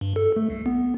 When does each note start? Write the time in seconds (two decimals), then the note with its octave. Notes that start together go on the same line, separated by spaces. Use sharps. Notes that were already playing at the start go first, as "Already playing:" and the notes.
0.01 G2
0.16 A4
0.36 A3
0.50 C2
0.66 B3